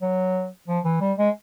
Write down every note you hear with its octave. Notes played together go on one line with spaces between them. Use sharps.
F#3
F3
E3
G3
G#3